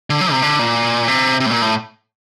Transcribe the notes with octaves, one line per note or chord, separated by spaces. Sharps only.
D3
F#3
C3
D3
A#2
C3
C3
A2
A#2
A2